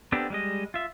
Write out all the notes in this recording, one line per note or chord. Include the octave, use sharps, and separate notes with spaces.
B3 C4 D4 G4 A4
G3 G#3 D#5
F4 E5